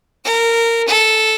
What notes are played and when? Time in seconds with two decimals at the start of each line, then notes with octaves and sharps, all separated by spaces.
0.25 A#4
0.88 A4